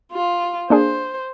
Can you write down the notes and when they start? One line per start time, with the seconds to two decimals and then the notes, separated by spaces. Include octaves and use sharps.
0.12 F4
0.70 A#3 D4 G#4 C5